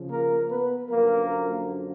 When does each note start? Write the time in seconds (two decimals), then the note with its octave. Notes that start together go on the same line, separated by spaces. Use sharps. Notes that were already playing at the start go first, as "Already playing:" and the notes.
Already playing: C#3 F3
0.11 A#3 A#4
0.50 B3 B4
0.89 F#2 D3 F3 A#3 A#4